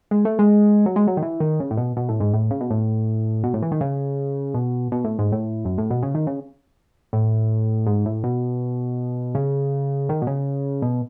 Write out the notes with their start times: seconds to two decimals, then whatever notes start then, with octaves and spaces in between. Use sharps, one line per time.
0.11 G#3
0.25 A3
0.39 G#3
0.86 F#3
0.96 G#3
1.07 F#3
1.17 D#3
1.22 E3
1.40 D#3
1.60 C#3
1.71 A2
1.77 B2
1.97 B2
2.09 A2
2.20 G#2
2.33 A2
2.51 C#3
2.61 B2
2.70 A2
3.44 B2
3.54 A2
3.62 E3
3.72 D#3
3.81 C#3
4.54 B2
4.92 B2
5.04 A2
5.19 G#2
5.32 A2
5.65 F#2
5.78 A2
5.90 B2
6.03 C#3
6.15 D#3
6.27 C#3
7.13 A2
7.86 G#2
8.06 A2
8.24 B2
9.35 C#3
10.09 D#3
10.22 B2
10.27 C#3
10.82 B2